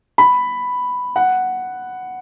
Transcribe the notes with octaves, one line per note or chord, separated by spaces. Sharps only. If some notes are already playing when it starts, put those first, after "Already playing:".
B5
F#5